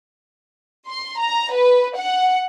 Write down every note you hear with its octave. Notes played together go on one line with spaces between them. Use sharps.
C6
A#5
B4
F#5